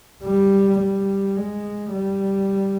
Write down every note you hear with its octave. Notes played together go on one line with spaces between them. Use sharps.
G3
G3
G#3
G3